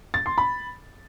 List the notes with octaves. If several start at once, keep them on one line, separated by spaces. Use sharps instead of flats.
A6
C6
B5